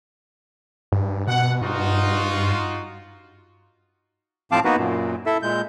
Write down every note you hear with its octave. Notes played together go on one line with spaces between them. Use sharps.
G2
B2 F#5
G2 D#4 F4 F#4
A2 F3 C4 F5 A5 D6
A#3 B3 D#4 F#4 B4
F#2 A#2
E4 A4 E5
A#2 G#3 G6